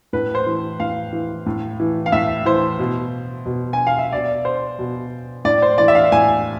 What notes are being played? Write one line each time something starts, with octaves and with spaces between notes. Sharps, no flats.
A2 B4
C5
E3
A2 F5
E3
A2
E3
F5
A2 E5
E3 C5
B2
B2
G#5
F5
E5
B2 D5
C5
B2
A2 D5
C5
E3 D5
E5
F5
A2 G#5